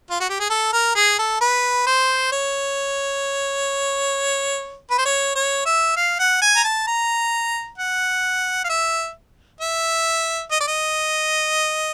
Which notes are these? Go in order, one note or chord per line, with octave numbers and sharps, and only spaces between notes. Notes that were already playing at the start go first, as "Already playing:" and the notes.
F4
F#4
G4
G#4
A4
A#4
G#4
A4
B4
C5
C#5
B4
C5
C#5
C#5
E5
F5
F#5
G#5
A#5
A5
A#5
F#5
F5
E5
E5
D#5
D5
D#5